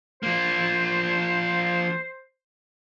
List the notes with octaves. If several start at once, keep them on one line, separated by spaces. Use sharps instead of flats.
F3 A#3 C5